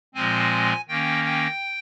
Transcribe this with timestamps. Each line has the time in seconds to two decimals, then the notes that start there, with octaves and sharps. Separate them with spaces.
0.14 A#2 F3 G#3 C4 G#5
0.89 D#3 A#3 C#4 G5
1.25 G5